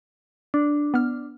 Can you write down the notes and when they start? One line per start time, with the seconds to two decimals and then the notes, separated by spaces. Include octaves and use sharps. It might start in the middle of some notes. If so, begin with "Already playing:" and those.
0.54 D4
0.94 B3 F6